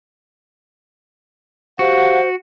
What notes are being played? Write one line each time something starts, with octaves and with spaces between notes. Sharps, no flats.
F#4 G4 C5 F5 F#5